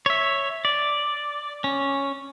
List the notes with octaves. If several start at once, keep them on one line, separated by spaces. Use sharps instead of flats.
C#5 E5
D5
C#4